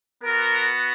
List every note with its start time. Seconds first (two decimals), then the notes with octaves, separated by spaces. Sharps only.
0.23 B3 F#4 A#4